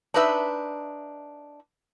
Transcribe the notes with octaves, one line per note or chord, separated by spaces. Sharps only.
D4 D#4 B4 E5